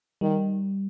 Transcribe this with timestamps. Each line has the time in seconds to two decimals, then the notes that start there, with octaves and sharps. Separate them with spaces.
0.21 D#3 G3